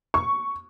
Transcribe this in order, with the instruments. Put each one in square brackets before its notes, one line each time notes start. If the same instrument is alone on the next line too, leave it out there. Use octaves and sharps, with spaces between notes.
[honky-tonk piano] C#6